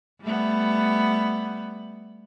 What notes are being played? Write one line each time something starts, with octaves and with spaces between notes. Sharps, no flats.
G3 A3 B3